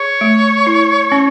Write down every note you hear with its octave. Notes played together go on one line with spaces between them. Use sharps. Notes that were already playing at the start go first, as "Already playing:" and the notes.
Already playing: G#4 C#5
A3
E4
C#4